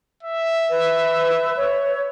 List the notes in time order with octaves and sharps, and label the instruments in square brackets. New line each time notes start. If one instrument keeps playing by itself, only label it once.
[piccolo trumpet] E5
[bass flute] B4
C#5